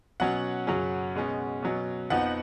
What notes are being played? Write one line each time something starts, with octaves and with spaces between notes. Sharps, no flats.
B2 F#3 C#4 F#5
F#2 C#3 F#3 C#4
B2 G#3 C#4
B2 F#3 C#4
F2 F3 B3 D#4 F#5